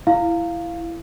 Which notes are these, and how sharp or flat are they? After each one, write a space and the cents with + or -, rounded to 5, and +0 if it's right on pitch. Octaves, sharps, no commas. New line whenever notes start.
E4 +15 F5 +0